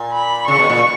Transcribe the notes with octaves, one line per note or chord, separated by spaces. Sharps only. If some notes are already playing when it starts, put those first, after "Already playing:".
Already playing: A#2
B5
C#3 C#6
B2
A#2